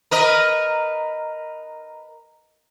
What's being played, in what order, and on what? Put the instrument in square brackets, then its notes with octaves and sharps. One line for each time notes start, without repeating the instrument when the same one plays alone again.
[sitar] A#4 B4 D#5